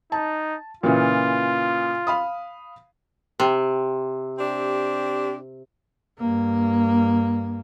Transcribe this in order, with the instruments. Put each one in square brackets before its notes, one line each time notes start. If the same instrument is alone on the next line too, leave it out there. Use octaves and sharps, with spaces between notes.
[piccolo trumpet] D#4 [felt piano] A5
[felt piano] A#2 C#3 E3 [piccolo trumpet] F4
[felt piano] F5 B5 D#6
[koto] C3
[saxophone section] C4 D4 G4
[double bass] G2 A#3